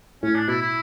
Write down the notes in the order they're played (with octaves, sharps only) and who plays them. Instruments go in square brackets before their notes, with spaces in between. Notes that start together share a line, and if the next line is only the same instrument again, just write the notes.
[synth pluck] A2 [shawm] C#4
[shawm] D4
[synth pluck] B2 [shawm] E4
[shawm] E4